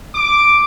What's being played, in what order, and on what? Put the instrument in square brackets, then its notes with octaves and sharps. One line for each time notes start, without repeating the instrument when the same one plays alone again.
[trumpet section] D6